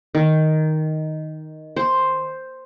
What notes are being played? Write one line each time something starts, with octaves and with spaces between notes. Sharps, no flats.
D#3
C5